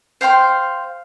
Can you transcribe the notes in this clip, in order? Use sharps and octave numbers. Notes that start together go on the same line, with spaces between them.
C5 F5 G5 C6